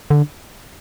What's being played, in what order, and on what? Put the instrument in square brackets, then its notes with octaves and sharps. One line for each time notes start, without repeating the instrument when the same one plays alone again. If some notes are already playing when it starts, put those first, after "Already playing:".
[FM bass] D3